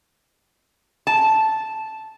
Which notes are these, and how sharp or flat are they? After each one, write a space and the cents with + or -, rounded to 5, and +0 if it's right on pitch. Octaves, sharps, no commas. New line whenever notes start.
A5 -5